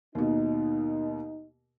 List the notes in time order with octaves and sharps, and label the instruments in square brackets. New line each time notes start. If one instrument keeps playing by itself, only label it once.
[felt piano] D#2 B2 [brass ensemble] D#4